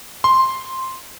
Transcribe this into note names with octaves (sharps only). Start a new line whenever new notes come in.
C6